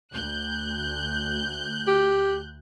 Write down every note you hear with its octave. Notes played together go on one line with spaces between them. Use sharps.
D2 F#6 G6
G4